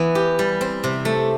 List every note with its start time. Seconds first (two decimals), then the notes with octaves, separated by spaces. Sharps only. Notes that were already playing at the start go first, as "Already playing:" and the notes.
Already playing: E3 B3
0.15 G4
0.39 G3
0.61 C4
0.84 C3
1.05 A3